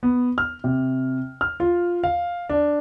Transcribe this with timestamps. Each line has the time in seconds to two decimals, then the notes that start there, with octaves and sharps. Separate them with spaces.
0.03 B3
0.38 F6
0.64 C3
1.41 F6
1.60 F4
2.04 F5
2.49 D4